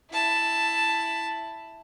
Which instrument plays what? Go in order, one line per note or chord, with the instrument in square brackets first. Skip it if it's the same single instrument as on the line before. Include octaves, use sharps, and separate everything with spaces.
[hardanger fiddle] E4 A5